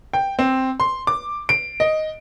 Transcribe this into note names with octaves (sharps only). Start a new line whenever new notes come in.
G5
C4
C6
D6
D7
D#5